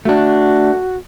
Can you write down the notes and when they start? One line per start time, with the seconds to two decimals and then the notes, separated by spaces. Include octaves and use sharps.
0.05 A3 D4 F#4